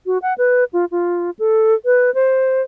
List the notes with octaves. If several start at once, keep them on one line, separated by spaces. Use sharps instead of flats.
F#4
F#5
B4
F4
F4
A4
B4
C5